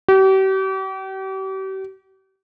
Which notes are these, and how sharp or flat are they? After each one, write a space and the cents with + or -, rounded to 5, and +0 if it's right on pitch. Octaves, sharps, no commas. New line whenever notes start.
G4 -40